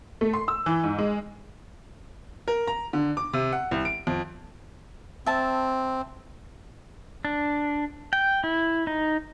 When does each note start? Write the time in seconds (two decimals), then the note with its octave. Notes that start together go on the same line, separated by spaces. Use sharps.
0.21 A3
0.33 C6
0.48 E6
0.66 E3
0.84 G#2
0.98 G#3
2.48 A#4
2.67 A#5
2.93 D3
3.17 D6
3.33 C3
3.52 F#5
3.71 C2
3.85 D7
4.07 F2
5.26 C4 E5 A5
7.25 D4
8.13 G5
8.44 E4
8.87 D#4